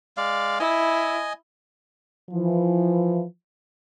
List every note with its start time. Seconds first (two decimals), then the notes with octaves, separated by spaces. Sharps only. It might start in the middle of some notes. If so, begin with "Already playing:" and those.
0.17 G#3 D5 F5
0.60 E4 D#5 G#5
2.30 E3 F3